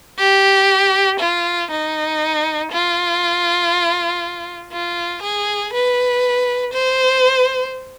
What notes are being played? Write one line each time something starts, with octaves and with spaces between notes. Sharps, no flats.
G4
F4
D#4
F4
F4
G#4
B4
C5